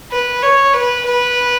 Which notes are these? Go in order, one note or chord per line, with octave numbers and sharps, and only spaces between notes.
B4
C#5
B4
B4